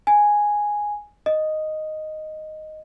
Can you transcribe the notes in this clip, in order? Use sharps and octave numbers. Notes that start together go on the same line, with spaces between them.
G#5
D#5